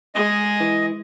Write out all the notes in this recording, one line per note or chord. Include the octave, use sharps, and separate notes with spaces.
G#3 G#4 D#5
E3